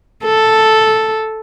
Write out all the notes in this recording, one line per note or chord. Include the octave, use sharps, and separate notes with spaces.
A4